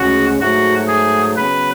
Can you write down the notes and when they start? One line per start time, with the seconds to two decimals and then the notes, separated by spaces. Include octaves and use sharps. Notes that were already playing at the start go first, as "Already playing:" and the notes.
Already playing: D2 C#3 G#3 C#4 F#4
0.39 G#2 F#3 A3 F#4
0.88 G#4
1.36 C#3 F#3 B3 B4